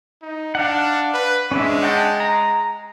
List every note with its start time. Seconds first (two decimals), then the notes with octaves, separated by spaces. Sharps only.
0.22 D#4
0.55 D4 F5 F#5
1.14 B4
1.51 G#3 C#4 D4 E5
1.83 F#5 G5 A5
2.20 A#5